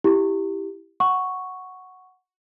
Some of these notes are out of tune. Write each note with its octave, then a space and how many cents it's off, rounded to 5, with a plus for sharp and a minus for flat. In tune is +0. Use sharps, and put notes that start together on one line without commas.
E4 +0 G4 +0
F#5 +0 C#6 +0